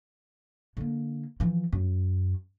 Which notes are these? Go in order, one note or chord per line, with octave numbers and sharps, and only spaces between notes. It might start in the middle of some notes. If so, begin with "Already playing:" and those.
D3 A#3
E3 F3
F#2